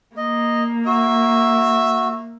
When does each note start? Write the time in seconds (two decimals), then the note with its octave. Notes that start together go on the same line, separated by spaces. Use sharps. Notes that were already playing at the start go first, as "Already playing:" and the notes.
0.17 A#3 D#5
0.86 F#4 E5